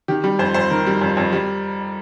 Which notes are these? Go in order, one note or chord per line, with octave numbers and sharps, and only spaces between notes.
D#3 G4
G3
F2 C5
F2 C5
D#3 A#4
G3
F2
F2
G3